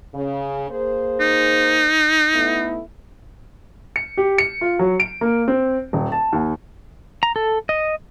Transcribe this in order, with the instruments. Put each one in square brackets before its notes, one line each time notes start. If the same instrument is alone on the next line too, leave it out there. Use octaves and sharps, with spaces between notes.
[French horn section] C#3
A#3 G#4 C5
[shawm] D#4
[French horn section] A3 B3 E4
[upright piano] C#7
G4
C#7
F4
F#3
D7
A#3
C4
D#1
A5
D#2
[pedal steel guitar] A#5
A4
D#5